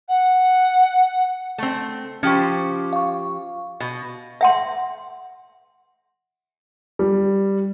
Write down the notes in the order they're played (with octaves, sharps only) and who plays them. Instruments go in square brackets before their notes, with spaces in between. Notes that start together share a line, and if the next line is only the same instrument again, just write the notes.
[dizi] F#5
[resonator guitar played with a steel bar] A3 C4
[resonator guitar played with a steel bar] F3 G4 C5 [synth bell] C#4 C#6
[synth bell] F5 C#6
[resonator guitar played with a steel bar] B2
[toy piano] E5 F#5 C6
[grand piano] G3